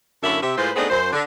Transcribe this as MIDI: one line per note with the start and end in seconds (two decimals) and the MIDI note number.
0.23 0.39 42
0.23 0.39 50
0.23 0.39 58
0.23 0.39 64
0.23 0.39 73
0.23 0.39 76
0.42 0.56 48
0.42 0.56 76
0.58 0.70 45
0.58 0.70 56
0.58 0.70 65
0.58 0.70 71
0.58 0.70 72
0.76 0.86 57
0.76 0.86 59
0.76 0.86 60
0.76 0.86 62
0.76 0.86 63
0.76 0.86 68
0.90 1.09 42
0.90 1.09 72
1.12 1.21 50